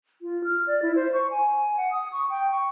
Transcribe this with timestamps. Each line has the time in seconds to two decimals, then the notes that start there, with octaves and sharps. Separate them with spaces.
0.22 F4
0.44 F6
0.67 D5
0.82 E4
0.96 C5
1.13 C#6
1.31 G#5
1.77 F#5
1.91 D#6
2.12 C#6
2.30 G5
2.51 C#6